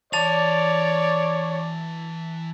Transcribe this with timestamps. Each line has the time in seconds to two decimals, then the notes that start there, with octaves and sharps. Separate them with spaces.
0.13 E3 C#5 D5 F5 A5 A6 F7